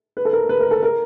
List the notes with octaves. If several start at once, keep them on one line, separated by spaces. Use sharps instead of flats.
B4
A4
A#4
B4
A#4
A4
A#4